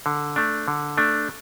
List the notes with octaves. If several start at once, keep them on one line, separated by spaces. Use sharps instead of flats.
D3
A3 D4
D3
A3 D4